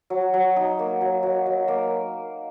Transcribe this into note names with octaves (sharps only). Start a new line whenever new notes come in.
F#3
F#3
D#4
A#3
F#3
F#3
F#3
A#3